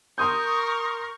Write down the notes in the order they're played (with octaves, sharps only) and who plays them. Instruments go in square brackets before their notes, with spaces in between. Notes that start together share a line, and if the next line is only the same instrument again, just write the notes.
[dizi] A#4 [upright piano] C6 D#6 G6 [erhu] C#6